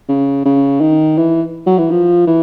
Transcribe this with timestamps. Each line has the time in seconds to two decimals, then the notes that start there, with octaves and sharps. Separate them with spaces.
0.09 C#3
0.46 C#3
0.81 D#3
1.18 E3
1.67 F#3
1.79 E3
1.91 F3
2.27 E3